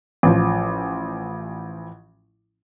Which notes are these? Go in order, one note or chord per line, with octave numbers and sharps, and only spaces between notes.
A1 F3